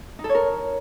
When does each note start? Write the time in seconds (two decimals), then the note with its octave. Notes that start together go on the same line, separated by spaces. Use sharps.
0.19 D#4
0.24 A4
0.29 C#5
0.35 A#4